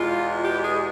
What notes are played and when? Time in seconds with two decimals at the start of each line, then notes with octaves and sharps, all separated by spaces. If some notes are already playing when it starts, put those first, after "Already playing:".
Already playing: E2 B2 G#3 F4
0.45 G4
0.63 G#4